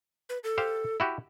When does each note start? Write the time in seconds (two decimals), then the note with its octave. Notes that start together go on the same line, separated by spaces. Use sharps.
0.29 B4
0.44 A4
0.58 G4 C5 F5
1.00 E4 F#4 G4